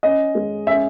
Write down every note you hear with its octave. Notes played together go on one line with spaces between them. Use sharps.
C#4 D#5
G#3
C#4 E5